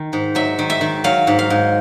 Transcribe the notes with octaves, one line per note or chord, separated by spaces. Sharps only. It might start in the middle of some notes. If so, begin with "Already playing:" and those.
Already playing: D#3
G#2
F#3 E5
D#3
E5
D#3
F#3 F5
G#2
F5
G#2